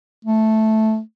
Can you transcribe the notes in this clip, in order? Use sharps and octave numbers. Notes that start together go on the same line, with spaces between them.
A3